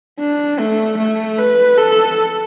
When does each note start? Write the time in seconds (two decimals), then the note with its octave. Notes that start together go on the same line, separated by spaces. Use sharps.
0.19 D4
0.59 A3
0.98 A3
1.39 B4
1.78 A4